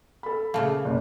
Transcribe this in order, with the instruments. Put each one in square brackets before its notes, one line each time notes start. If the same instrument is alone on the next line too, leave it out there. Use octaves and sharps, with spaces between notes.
[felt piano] A4 B5
[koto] A#2 C#3 A3 [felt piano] F5
[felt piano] F#1